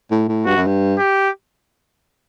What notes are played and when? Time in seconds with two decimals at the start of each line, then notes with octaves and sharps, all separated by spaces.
0.11 A2
0.28 A2
0.46 G2 F#4
0.56 F#2
0.67 G2
0.98 G4